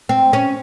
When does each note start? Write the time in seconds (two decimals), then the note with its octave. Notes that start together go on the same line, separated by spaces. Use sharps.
0.09 C4
0.33 C#4